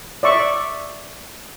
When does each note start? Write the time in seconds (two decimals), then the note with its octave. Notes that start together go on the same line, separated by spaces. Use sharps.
0.23 D5 E5 C#6